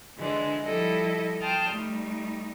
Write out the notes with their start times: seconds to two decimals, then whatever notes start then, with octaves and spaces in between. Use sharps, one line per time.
0.17 D3 E3 G#3 D4
0.64 F3 G3 E4 A4 D#5
1.41 G5 A5 C6 D#6 F6 G6
1.70 G3 A3 D#4